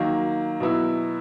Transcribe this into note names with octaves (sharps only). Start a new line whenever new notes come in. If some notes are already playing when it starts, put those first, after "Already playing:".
Already playing: D#3 F#3 A#3
B2 F#3 B3 E4